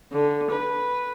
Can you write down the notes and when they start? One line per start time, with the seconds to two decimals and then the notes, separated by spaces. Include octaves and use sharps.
0.11 D3
0.50 B4